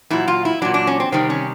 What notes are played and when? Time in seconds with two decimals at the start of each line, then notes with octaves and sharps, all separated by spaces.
0.10 A#2 F#3 E4
0.28 F4
0.45 E4
0.62 A#2 F#3 D4
0.74 D4
0.87 C#4
1.00 C4
1.12 C3 D#3 G3 C4
1.30 C#4